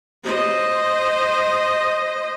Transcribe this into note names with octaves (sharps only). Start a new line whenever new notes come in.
C5 D#5